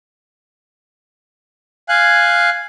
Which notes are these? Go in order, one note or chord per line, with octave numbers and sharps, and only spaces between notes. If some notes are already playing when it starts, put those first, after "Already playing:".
F5 G#5 F#6